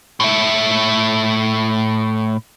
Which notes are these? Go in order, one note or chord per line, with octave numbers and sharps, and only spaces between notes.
A2 E5